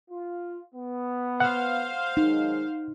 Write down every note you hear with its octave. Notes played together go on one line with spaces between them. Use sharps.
F4
B3
C5 F5 F#5
D#3 F#3 G#3 D#4